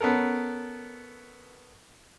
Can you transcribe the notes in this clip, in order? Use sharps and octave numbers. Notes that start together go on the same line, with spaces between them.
B3 C#4 A4 A#4